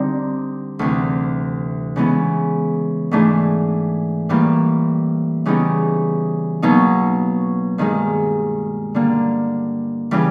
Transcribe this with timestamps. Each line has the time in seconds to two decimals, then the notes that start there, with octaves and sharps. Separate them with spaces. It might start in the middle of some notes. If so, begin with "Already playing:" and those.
Already playing: D3 G3 C4 D#4
0.79 D2 C3 E3
1.96 C#3 E3 G#3 B3 E4
3.11 G#2 E3 A3 D4
4.29 A2 E3 G3 A#3
5.46 C#3 E3 G3 B3 D#4
6.62 B2 F#3 A#3 D#4
7.78 G2 D#3 G#3
8.95 D3 G3 A#3
10.11 C#3 E3 G3